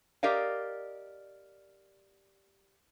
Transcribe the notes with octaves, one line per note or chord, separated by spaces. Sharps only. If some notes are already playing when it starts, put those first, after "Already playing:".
G4 A#4 D5 D#5 F5